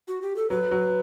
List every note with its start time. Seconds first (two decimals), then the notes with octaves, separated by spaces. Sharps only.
0.08 F#4
0.22 G4
0.36 A4
0.50 F#3 B4
0.71 F#3